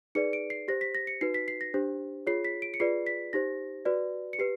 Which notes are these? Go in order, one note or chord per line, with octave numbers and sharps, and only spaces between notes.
D#4 G#4 B4 D5 C#7
D7
C7
G4 C5 A#6
B6
A#6
C#7
D#4 F#4 B4 C7
B6
C7
A#6
D4 G4 C5
F4 G#4 C#5 C7
B6
D7
C#7
F4 G#4 B4 D5 C7
B6
D#4 G4 C5 A#6
F#4 B4 D5
C#7
G4 B4 C7